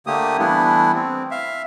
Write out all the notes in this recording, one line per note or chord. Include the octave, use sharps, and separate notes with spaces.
D3 A3 A#3 G4 D#6
E3 G3 A3 B3 D4 E4
C4
E5 F5